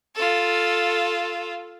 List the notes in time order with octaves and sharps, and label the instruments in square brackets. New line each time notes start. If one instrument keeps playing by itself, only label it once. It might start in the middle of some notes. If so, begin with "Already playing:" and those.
[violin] F4 A4